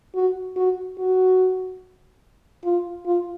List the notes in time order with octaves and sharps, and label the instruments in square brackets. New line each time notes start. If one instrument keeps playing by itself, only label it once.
[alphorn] F#4
F#4
F#4
F4
F4